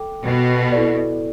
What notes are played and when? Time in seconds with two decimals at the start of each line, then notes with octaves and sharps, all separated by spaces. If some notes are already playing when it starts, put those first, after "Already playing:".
Already playing: A4 G5 D6
0.24 B2
0.72 E4 A4 D5